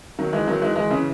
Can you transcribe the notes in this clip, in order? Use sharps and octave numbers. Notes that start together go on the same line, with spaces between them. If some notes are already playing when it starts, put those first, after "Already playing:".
D#3 F#3
E3 G#3
D#3 F#3
E3 G#3
E3 G#3
C#3 E3